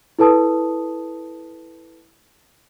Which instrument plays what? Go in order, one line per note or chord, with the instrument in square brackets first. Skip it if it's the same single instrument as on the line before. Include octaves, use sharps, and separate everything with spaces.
[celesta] E4 A4 B4 A5 D#6